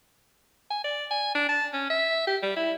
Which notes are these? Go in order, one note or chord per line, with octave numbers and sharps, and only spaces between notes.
G#5
D5
G#5
D4
A5
C#4
E5
G4
G3
E4